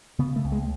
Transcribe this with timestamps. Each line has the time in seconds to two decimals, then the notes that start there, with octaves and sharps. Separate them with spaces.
0.19 C#3 B3
0.36 A3
0.45 C#2
0.52 G#3